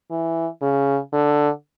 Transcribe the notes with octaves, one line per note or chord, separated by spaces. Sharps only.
E3
C#3
D3